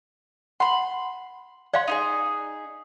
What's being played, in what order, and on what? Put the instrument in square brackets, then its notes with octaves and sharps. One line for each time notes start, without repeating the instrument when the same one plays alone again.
[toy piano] F#5 [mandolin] B5 C6
[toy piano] D5 F5 C6 [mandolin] F#5
[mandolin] D#4 G4 G#4